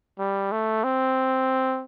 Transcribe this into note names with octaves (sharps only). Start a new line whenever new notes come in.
G3
A3
C4